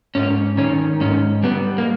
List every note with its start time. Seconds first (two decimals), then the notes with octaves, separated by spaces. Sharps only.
0.15 G#2 C#4
0.57 D#3 C#4
1.01 G#2 C#4
1.43 G3 B3
1.78 A#3